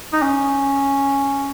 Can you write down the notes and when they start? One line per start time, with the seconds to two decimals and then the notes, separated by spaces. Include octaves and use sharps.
0.12 D#4
0.22 C#4